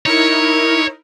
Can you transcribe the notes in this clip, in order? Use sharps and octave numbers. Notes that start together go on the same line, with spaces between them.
D#4 E4 A#4 C#5